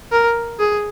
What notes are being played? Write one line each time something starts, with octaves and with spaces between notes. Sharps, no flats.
A#4
G#4